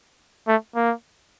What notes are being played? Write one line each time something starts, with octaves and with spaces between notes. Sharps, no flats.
A3
A#3